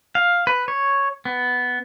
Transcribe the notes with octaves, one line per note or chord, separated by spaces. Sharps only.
F5
B4
C#5
B3